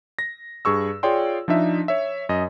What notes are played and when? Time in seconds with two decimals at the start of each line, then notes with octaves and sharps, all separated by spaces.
0.19 A#6
0.65 G2 G#4 C#6 E6
1.03 F4 G#4 C#5 D5 G5 C6
1.48 F3 D4 D#4 E5
1.88 C#5 E5
2.29 F#2 D#5